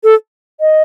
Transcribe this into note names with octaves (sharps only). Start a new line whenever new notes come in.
A4
D#5